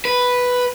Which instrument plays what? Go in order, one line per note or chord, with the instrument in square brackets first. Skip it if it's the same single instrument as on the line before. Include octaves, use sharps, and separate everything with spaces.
[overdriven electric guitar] B4